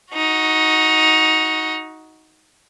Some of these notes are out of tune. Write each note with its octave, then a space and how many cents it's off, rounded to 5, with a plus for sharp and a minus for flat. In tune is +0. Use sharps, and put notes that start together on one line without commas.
D#4 +15 F#4 -5